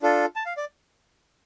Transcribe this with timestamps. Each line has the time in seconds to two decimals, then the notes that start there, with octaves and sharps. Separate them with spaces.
0.02 D4 F4 A4
0.36 A5
0.46 F5
0.57 D5